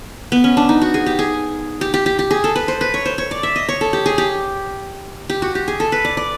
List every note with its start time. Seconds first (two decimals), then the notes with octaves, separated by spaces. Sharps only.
0.32 B3
0.44 C#4
0.57 D4
0.69 D#4
0.82 F#4
0.94 G#4
1.06 G4
1.19 G#4
1.81 G4
1.94 G4
2.06 G4
2.19 G4
2.31 G#4
2.44 A4
2.56 B4
2.68 C5
2.81 B4
2.94 C#5
3.06 C5
3.18 C#5
3.31 D5
3.43 E5
3.56 D#5
3.69 C#5
3.81 A4
3.93 G4
4.06 G#4
4.18 G4
5.30 G4
5.42 F#4
5.55 G4
5.68 G#4
5.80 A4
5.92 B4
6.05 D5
6.17 D5